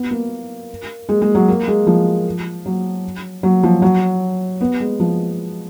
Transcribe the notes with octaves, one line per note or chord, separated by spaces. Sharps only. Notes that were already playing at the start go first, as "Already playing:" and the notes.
Already playing: B3
A#3
G#3
G#3
F#3
A#3
G#3
F3
F#3
F#3
F3
F#3
B3
G#3
F3